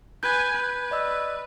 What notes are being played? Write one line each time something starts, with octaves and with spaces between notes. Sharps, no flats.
B4 G#5 G6 G#6
B4
D5 D#5 E6